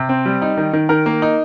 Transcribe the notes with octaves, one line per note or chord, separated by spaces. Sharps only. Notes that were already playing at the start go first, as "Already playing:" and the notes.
Already playing: C3
C4
G3
D#4
D#3
D#3
D#3 A#4
A#3
D#4